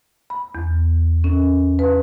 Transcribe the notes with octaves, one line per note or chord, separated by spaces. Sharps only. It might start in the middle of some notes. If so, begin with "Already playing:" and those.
B5
E2
C#4
B4